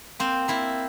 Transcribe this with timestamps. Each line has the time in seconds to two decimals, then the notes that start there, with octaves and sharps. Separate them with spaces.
0.20 A#3 C4
0.48 A#3 E4